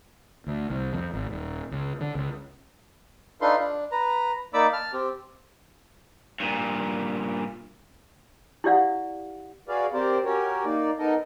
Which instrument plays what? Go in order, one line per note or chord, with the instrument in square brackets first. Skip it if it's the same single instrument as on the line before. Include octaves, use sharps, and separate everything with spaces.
[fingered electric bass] D2
C2
F2
G#1
D#1
C#2
D3
C#2
[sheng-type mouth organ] D4 D#4 F4 A4 B4 C6
D4
B4 A#5
A#3 D#4 D5 B5 D6 E6
A5 F6
C4 G4
[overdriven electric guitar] G2 A#2
[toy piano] E4 G4 D5 F5 F#5
[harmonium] F#4 G#4 B4 D5 F5
C4 G4 A#4 C5 D5
C#4 F#4 G4 A#4 C#5
A#3 D#4 D5
B3 D#4 A4 A#4 D#5